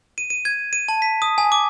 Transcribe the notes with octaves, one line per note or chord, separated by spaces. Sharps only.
D#7
D#7
G#6
D#7
A5
B6
D#6
G#5
D6